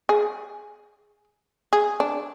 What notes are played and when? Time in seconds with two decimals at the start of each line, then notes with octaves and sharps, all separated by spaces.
0.09 G#4
1.73 G#4
2.00 D4